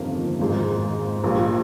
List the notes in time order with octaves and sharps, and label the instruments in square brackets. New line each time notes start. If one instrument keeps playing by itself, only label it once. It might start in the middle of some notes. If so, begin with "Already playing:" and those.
Already playing: [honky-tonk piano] G1 F2 C3 D#3 A#3
G#1 G#2 F3 G#3
A#1 A#2 G3